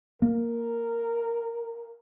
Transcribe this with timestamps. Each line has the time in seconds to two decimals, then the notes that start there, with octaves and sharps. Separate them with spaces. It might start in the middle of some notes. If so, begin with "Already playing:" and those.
0.22 A#3 A#4